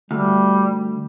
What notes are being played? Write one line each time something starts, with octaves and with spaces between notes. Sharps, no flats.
D2 G3